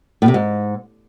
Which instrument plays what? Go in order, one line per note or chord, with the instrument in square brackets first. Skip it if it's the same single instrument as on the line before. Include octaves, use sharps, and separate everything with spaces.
[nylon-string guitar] A2
C3
G#2